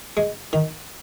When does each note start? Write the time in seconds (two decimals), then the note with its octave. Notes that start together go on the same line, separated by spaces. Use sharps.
0.17 G#3
0.53 D#3